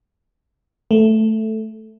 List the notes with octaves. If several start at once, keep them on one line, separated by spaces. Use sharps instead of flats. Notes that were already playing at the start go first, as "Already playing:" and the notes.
A3